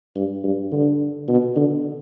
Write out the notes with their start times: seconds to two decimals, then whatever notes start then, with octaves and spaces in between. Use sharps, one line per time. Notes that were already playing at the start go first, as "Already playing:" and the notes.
0.16 G2
0.44 G2
0.72 D3
1.28 B2
1.56 D3